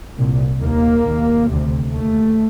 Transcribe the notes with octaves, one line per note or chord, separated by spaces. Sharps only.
C2 A#2
D#2 A#3
D#2
D2 C3
D#2 A3